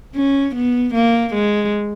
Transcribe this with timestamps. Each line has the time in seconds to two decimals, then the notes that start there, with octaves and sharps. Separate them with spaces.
0.16 C#4
0.55 B3
0.94 A#3
1.34 G#3